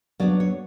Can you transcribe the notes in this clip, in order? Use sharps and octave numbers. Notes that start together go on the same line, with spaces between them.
F#3 B3 D4 D5
C#5